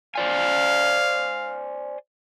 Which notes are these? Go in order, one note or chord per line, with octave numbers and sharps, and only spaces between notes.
C5 D5 F5 G#5